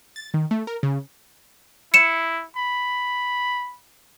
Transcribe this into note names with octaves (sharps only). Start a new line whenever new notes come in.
A6
D#3
A3
A#4
C#3
E4 C#7 E7
B5